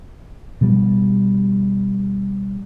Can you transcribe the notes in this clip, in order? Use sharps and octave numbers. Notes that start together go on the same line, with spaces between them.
B2 F3 G3